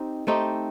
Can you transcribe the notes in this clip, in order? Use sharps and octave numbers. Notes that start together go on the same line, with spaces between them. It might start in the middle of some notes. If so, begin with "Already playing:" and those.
Already playing: C4 D#4 G4
A3 C4 D#4 G4